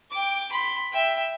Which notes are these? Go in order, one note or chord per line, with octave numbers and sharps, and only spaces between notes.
G5 D6
B5 C6
E5 G5